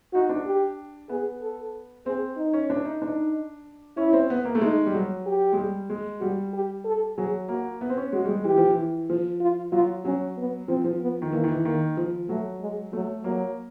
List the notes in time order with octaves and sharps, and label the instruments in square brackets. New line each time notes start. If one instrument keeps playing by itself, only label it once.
[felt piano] D#4 [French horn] F#4
[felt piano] D4
[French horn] G4
[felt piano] B3 [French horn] G#4
[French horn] A4
[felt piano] C4 [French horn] G#4
[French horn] D#4
[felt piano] C#4
D4
D#4
[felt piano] D4 [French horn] D#4
[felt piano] C#4 [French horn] E4
[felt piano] C4
B3
A#3
A3
[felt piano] G#3 [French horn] D#4
[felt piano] G3
F#3
[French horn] G4
[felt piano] G#3
G3
G#3
[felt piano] G3 [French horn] F#4
[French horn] G4
A4
[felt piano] F#3 [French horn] G#4
[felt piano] A#3 [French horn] F#4
[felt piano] B3
C4
C#4
[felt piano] G#3 [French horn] F#4
[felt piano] G3
G#3
[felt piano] E3 [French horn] G4
[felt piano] F3
E3
F3
[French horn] F4
[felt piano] F#3 [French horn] F4
[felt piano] F#3 [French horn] C#4
[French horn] B3
[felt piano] F3 [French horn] C4
[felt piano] F3
[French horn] B3
[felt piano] D#3
[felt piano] E3 [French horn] A#3
[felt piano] D#3
E3
[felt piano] D#3 [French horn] A#3
[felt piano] F3
[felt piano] F#3 [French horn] A3
[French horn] G#3
[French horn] F#3 [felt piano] A3
[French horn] F#3 [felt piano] A#3